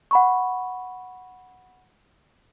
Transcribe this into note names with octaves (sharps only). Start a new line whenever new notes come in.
F#5 B5 C#6